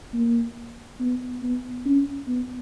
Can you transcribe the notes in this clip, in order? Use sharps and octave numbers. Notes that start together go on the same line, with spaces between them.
A#3
B3
B3
C#4
B3